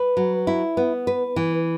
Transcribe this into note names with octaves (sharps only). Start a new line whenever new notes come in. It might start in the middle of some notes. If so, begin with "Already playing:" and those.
Already playing: B4
F#3
E4
B3
B4
E3